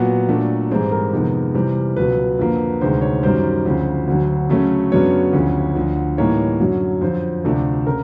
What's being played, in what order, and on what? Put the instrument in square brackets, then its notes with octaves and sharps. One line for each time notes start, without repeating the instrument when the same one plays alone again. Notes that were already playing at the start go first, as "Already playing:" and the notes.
Already playing: [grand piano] A#2 F#3 B3 F#4
A#2 F#3 A3 D4
G#2 E3 G3 C4 E4 G#4
A#4
F2 C3 D#3 G#3 B3
C3 E3 G3 C4
C#2 B2 F#3 B4
F2 D3 F3 A#3
D2 C3 D#3 G#3 C5
C#5
F#2 D#3 G3 C5
D2 C#3 F3
D2 D3 F#3
C#3 F#3 A3 C#4
F#2 C#3 F#3 B3 D4 C#5
D2 C#3 F3
D2 D3 F3
A2 E3 G3 A#3 D#4 C#5
F#2 D3 F#3
F2 D3 F3 C5
D2 C3 F3 A3 D4
C#3 A#4